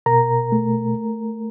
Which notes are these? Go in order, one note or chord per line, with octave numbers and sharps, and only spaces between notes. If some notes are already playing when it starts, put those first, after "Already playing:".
B2 A#4 A#5
A3